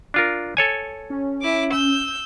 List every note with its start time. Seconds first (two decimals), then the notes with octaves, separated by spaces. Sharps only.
0.14 D4 F4 A#4
0.57 A4 C#5 G#5
1.10 C#4
1.42 E4 D6
1.72 E6 G6